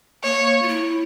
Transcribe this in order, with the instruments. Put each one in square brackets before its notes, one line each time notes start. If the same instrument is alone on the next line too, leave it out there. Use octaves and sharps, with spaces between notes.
[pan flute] A#3 [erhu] C#5
[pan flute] F4
E4